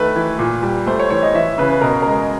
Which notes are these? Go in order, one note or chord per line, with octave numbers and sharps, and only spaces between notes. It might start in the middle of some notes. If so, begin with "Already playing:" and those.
Already playing: D#3 A3 B4
E3
A#2
G3
A3 C5
C#5
E3 C#5
D#5
E3 E5
C#3 B4
B4
B2 A#4
G#3 A#4